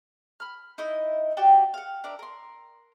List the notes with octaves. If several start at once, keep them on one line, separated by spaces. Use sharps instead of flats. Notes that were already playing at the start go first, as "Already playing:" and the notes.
B5 F6
D#4 E4 D#5
F#4 G4 D5 G5
F5 F#5
D4 A#4 D5 E5
A#4 C6